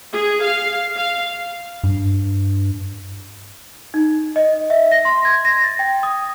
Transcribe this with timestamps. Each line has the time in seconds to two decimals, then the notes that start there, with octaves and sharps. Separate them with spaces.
0.12 G#4
0.42 F5
0.96 F5
1.84 G2
3.94 D#4
4.36 D#5
4.70 E5
4.92 A#6
5.05 C6
5.25 G#6
5.45 A#6
5.64 A6
5.79 G5
6.03 D#6